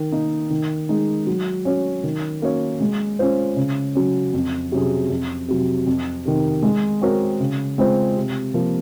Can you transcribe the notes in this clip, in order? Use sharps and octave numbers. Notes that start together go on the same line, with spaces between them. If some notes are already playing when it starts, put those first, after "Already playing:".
Already playing: D#3
A#3 D#4
D#3
G#3 D#4 G#4
F#3
C#4 F#4 C#5
D#3
A#3 C#4 F#4 C#5
G#3
C#4 F4 C5
C#3
F#3 C#4
F2
C3 F#3 C#4 G#4
F2
C3 F#3
F2
C3 D#3
G#3
C4 F#4 A#4 C#5
C#3
G#3 C4 F4 C5
C3
F3 A#3